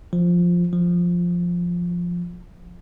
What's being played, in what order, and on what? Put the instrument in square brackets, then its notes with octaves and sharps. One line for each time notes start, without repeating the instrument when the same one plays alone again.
[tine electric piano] F3
F3